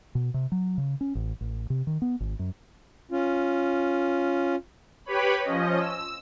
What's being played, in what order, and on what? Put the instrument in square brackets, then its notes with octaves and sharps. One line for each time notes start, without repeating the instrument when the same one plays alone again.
[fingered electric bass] B2
C3
F#3
C#3
C#4
A1
A1
C3
D#3
B3
G#1
F#2
[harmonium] C#4 F4
[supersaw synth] G4 B4 C#5 B5
F3 C#4 D#5
E6